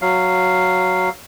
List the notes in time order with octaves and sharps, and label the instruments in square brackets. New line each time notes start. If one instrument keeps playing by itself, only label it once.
[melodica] F#3 F5